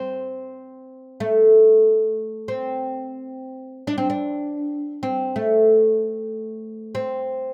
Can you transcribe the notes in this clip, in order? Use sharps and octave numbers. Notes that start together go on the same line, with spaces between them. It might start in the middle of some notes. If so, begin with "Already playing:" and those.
Already playing: C4
A3
C4
D4
C4
D4
C4
A3
C4